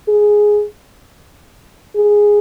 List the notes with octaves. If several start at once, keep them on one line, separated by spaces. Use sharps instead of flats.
G#4
G#4